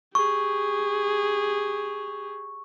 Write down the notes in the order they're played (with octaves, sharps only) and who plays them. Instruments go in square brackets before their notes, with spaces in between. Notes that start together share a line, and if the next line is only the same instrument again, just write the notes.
[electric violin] G4 G#4 [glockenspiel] C#6